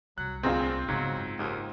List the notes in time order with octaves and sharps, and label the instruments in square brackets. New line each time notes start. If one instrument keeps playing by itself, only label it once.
[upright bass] C2 [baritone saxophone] F#3 [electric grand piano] F#6
[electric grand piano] D2 G#4 A#5 [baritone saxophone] A#2 [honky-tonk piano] C4 F4
[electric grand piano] G#2 [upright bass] C#3 B3 [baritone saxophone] F#3
[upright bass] F#1
[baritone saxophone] D#2 [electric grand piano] G#2